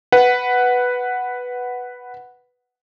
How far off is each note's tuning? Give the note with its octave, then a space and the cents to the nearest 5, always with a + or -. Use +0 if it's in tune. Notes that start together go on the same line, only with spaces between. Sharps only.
B4 +0 F#5 +0